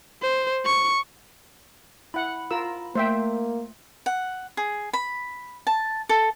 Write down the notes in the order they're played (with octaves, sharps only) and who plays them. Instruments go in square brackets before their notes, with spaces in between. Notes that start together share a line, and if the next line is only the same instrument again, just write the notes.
[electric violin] C5
C#6
[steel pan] E4 F#5 [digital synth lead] B5
[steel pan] F4 A#4 E6
[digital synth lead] A3 [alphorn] A#3 [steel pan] C5 E5 G5
[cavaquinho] F#5
G#4
B5
A5
A4